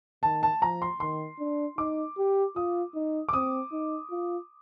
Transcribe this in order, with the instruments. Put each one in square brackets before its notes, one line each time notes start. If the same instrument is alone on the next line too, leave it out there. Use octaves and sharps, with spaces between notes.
[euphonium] D#3 [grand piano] A5
[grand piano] A5
[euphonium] F3 [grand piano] A#5
[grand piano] C6
[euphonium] D#3 [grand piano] C6
[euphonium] D4
[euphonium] D#4 [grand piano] D6
[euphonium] G4
[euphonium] F4 [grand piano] D#6
[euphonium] D#4
[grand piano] D6
[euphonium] C4 [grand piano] D#6
[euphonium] D#4
F4